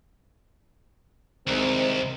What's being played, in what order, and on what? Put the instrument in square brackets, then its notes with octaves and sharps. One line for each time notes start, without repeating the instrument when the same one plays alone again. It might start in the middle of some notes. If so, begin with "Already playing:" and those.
[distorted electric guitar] C2 [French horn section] D#3 G#3 C4